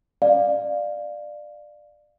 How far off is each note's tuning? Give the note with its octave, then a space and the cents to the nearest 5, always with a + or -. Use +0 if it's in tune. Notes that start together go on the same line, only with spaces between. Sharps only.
D5 +20 F5 +0